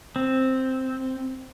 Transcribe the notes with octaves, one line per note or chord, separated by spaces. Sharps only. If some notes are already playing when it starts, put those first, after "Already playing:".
C4